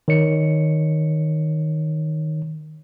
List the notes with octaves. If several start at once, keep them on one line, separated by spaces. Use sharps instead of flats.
D#3 C#5 C#7